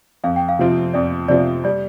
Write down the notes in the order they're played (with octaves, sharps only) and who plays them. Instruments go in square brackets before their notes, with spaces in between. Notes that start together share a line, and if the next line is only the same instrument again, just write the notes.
[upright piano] F2 [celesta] F5
[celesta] G5
F5
[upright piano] C3 F3 C4 F4
[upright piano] F2 [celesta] D5
[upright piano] C3 F3 C4 F4 [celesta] D5
[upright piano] G3 [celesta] D5